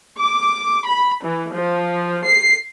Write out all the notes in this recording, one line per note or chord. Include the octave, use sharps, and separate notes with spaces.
D6
B5
E3
F3
C7